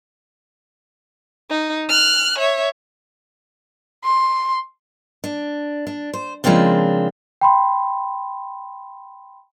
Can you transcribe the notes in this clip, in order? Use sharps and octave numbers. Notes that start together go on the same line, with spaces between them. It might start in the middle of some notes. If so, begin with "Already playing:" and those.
D#4
F6 F#6
C#5 E5
C6
D4
D4
C5
C#3 F3 G#3 A#3 C4 D4
G5 B5 C6